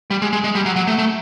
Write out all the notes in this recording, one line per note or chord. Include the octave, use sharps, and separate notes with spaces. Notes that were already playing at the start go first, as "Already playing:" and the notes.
G3
G#3
G#3
G#3
G3
F#3
F#3
A3
A3